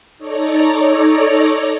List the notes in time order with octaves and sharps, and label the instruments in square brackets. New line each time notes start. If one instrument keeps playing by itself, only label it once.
[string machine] D#4 A4 C#5 D5 A#5